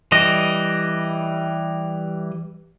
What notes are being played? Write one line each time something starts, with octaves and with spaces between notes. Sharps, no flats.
E3 G3 D#5